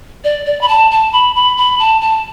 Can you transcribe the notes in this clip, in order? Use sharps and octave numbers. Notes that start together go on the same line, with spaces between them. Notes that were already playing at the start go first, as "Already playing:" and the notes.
D5
D5
B5
A5
A5
B5
B5
B5
A5
A5